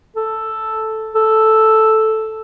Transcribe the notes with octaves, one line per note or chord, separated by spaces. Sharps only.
A4
A4